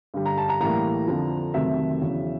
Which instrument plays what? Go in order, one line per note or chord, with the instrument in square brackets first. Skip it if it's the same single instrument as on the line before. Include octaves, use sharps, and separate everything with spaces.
[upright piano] G2 D3 G3
A#5
A5
A#5
A2 E3 G3 A#3 A#5
F2 D3 F3
F2 C3 D#3 F#3 A3 E5
E2 C#3 F#3